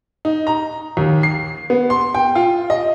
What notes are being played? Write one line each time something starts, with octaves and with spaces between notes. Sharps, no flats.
D#4
A#5
D#2
C7
B3
C6
G5
F4
D#5